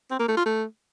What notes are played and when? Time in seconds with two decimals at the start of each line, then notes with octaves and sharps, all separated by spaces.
0.11 C4
0.19 A#3
0.28 A3
0.37 F4
0.46 A3